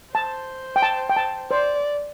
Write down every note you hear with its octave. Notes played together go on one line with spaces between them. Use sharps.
C5 A5
G5
A5
G5
A5
C5 D5